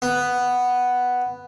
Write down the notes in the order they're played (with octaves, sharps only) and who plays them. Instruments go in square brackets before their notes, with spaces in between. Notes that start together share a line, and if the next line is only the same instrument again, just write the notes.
[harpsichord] B3